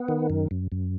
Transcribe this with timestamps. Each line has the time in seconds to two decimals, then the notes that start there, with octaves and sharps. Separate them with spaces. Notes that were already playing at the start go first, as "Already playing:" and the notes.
Already playing: B3
0.08 D#3
0.30 F#2
0.51 F#2
0.72 F#2